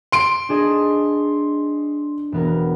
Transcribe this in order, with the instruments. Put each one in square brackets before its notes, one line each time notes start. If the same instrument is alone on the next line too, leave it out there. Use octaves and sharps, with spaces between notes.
[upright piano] C6 D7
[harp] D4 G#4 D#5
E1 B3 A#4